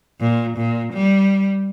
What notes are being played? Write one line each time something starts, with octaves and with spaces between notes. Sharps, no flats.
A#2
A#2
G3